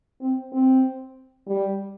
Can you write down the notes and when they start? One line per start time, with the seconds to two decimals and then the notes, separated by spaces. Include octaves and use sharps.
0.21 C4
0.53 C4
1.47 G3